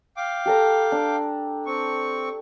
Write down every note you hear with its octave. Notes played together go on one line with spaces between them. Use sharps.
F5 G5 D6
G4 A4 A#5
D4
C4 C#6